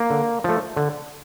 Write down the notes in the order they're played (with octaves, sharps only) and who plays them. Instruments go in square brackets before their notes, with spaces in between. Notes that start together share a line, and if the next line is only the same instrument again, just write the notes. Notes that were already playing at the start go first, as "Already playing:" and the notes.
Already playing: [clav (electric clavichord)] A#3
D3
F3 A3
D3